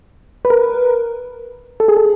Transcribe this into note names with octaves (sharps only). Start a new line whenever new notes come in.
B4
A#4
A4
G#4
A4